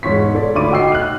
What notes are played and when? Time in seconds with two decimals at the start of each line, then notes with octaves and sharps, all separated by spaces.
0.03 E1 G#2 C#5 C#6 B6
0.35 A4 C#5 D5
0.55 D2 B5 C#6 D6 D#7
0.71 F#4 D#5 G5 E6 C7
0.92 F6 F#6